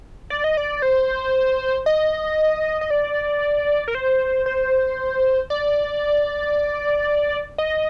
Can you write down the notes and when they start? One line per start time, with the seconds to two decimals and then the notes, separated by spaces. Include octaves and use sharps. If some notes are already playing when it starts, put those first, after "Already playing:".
0.30 D5
0.44 D#5
0.57 D5
0.82 C5
1.86 D#5
2.81 D#5
2.90 D5
3.88 A#4
3.95 C5
4.46 C5
5.50 D5
7.58 D#5